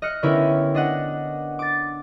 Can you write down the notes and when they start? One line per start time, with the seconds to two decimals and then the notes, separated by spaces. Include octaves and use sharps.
0.02 D#5 F6 F#6 C#7
0.23 D3 B3 C#4 E4 G4 A#4
0.75 D4 D#5 F#5
1.59 D6 A6